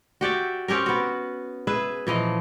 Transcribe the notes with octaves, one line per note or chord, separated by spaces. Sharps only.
F#4 G4 D5 E5
C4 C#4 G4 A#4
B3 F#4
G#4 B4 E5
A#2 E3 F3 D#5